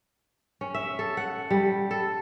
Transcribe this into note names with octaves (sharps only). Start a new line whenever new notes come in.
C#4
E5
A4
F#5
G3
A4